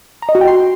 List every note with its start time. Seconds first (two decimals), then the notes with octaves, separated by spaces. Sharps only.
0.22 A#5
0.29 D#5
0.35 F#4
0.41 G5
0.47 C6